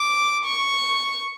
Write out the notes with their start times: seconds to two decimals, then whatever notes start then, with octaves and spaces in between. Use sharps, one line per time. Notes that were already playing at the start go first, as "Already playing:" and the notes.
Already playing: D6
0.45 C#6